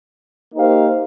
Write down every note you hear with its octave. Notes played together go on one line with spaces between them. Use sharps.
A#3 D#4 G4 C5 F5